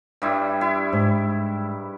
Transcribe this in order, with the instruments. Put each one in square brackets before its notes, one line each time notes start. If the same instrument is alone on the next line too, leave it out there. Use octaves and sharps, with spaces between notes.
[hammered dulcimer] G2 G3 E4
E4
[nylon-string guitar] G#2